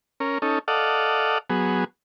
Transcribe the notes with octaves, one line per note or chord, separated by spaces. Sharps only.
C#4 A#4
C#4 D#4 A4
A4 D5 D#5 F5 F#5
F#3 B3 G#4